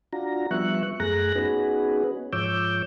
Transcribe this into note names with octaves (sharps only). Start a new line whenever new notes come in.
D4 F4 F#4 A#5
F3 G3 B3 E5 C#6 F#6
F#2 A3 G#4 A#5 F#6 A#6
B3 C#4 D#4 F#4 G#4 B4
G#2 F3 C#5 D6 E6 G6